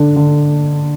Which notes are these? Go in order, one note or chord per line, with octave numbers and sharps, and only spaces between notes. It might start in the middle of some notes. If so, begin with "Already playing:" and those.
Already playing: D3 D4
D3